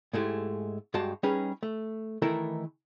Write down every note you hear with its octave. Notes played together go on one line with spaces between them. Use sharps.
G#2 G#3 A3 E4 G4
G2 G#3 F#4 G4 A5
G3 C#4 D#4 G#4 B4
A3
D#3 E3 A3 E4 A4 A#4